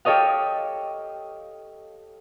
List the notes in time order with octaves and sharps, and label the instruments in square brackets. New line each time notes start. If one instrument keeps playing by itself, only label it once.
[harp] G4 A4 C#5 D#5 F5